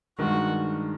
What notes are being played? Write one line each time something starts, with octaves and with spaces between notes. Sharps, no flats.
G2 D#3 G#3 F#4